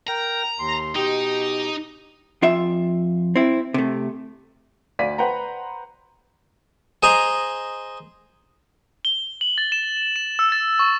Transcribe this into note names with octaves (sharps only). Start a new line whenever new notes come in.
A#4 G5 A#5
D#2 C6
B2 D#4 G4
F2 F4 E5
C4 E4
C3 A3
D2 D5 F5 B6 D#7
B4 C5 F#5 G5 A#5
G#4 C5 D#5 G#5 A#5
G7
F#7
A6
E7
E7
E6
A6
C#6